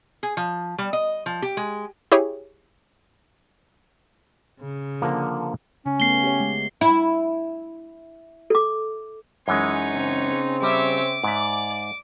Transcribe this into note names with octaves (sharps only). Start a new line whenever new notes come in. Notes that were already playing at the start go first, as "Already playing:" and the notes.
G#4
F3
G3
D#5
F3
G4
G#3
E4 G4 G#4 C#5
C#3
D3 F3 A#3
C#3 C#4
A3 B3 C7 G7
G4 C#5
G#3
E4
A4 D6
F#2 E3 G#3 C#4 D#4 B4 G#5 C#6
C#3 C4
G3 C#5 E5 D6
G#2 D5 E5